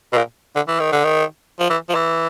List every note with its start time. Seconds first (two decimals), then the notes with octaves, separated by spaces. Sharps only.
0.13 B2
0.17 A#2
0.56 D3
0.68 E3
0.80 D#3
0.92 D3
1.04 D#3
1.60 F3
1.70 E3
1.89 F3
1.95 E3